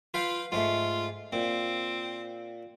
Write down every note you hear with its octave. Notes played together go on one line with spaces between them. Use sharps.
F4 B4 F5 G5
G#2 G#3 A3 F4
A#2 C4